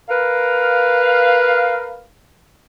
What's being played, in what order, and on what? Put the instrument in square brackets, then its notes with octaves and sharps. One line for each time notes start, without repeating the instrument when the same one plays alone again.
[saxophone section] A#4 B4 F5